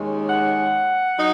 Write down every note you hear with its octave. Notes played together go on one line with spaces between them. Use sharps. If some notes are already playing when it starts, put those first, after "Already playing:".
Already playing: D#2 D#3 G#3 C#4
F#5
F#3 D#4